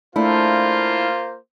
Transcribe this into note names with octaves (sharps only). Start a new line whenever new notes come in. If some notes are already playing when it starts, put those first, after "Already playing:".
A3 A#3 D4 E4 F4 C5